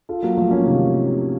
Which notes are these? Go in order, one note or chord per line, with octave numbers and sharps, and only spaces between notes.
F4 A4
F#3 A#3
F3 A3
A#3 C#4
C3 D#3